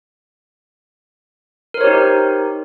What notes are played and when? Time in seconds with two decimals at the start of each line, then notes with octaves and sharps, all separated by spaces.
1.74 A#4
1.78 C5
1.81 C#5
1.84 G4
1.87 D#4